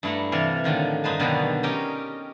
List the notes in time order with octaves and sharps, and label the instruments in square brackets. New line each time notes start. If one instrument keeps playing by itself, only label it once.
[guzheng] G2 A3 E4 F#5 A#5
C3 E3 A4 D5 F5 G#5
A2 D3 D#3 F3
G2 D#4 B4 C5 G#5 A5
B2 D3 D#3 F#3 G3
C#4 D#4 G4 A#4 D#5